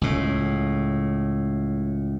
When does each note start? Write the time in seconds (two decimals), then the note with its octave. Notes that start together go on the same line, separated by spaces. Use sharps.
0.01 C#2 A2